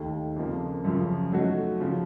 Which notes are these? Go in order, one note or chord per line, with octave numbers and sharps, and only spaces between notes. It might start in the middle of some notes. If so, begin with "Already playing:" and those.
Already playing: D#2 D#3 A3
F2 C#3 F3 A#3
F#2 C#3 F3
F#3 A3 D#4 F#4
C#3 F3